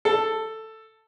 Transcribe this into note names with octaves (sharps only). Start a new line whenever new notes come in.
A4